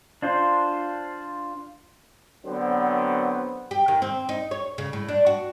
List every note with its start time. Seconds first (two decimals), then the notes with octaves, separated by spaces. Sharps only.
0.22 D4 F4 C5
2.46 D3 F#3 B3 C4 C5
3.71 G4
3.88 D#3
4.02 C4
4.29 D#4
4.51 C#5
4.78 C#3
4.93 A2
5.09 D4
5.26 F#4